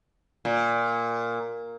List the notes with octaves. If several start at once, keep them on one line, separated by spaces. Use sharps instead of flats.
A#2